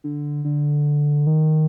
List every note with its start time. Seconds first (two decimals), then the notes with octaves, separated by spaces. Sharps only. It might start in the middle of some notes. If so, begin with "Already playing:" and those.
0.04 D3
0.45 D3
1.27 D#3